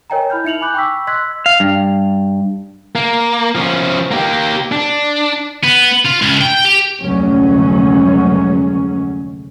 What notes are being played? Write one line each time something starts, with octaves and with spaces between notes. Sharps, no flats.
A#4 C#5 D#5 G5 G#5 A#5
E4 B5 F6 G6
D#4 E5 C#7 F7 F#7
G#5 B5 D6 F#6 G6
G5 B5 C#6 D6 E6 B6
D#5 C6 E6 F#6 G#6 B6
F5
G2
A#3
F3 C#4
A#3 G4
D4
B3
F4
C#2
G5
G4
F1 D2 F#3 G#3 C#4